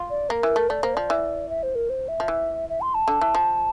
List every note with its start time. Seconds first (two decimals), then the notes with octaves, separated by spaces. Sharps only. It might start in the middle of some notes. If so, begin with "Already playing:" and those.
Already playing: F4
0.10 D5
0.29 A#3 A#4
0.43 E3
0.56 A3
0.69 A3 D5
0.83 A#3 C5
0.94 F3 D5
1.10 E3
1.49 E5
1.63 C5
1.75 A#4
1.89 C5
2.08 E5
2.20 F3
2.28 E3
2.69 E5
2.81 C6
2.94 A5
3.08 D3
3.21 E3
3.35 F3